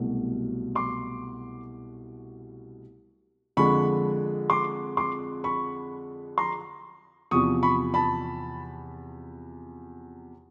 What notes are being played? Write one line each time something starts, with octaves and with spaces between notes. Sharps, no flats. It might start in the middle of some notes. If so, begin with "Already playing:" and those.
Already playing: C2 B2 F#3 A3
C6 D6
F2 D3 F3 G#3 B5 C#6
C6 D6
C6 D6
B5 C#6
A#5 C6
E2 C3 F3 C#6 D#6
B5 C#6
A5 B5